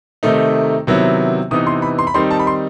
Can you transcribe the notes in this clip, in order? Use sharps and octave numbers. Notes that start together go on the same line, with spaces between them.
C3 D#3 A3 D#4
C3 D#3 F#3 B3 E4
C3 E3 B3 D#4 D#6
C6
B5
C6
B5
D#3 G3 C4 D#4 C6
A5
B5
C6